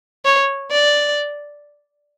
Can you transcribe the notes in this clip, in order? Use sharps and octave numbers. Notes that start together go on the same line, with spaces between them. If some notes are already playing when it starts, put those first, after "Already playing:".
C#5
D5